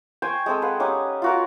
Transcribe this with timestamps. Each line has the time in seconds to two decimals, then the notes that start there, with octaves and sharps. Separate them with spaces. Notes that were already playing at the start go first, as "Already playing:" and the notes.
0.22 C5 G5 G#5 C#6
0.46 G#3 C4 A4
0.62 B4 F5 F#5
0.80 C#4 D#4 G4 F#5
1.22 F4 F#4 A#4